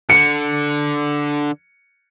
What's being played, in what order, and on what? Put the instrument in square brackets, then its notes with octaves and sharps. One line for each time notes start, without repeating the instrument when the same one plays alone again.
[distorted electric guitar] D3 [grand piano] C#7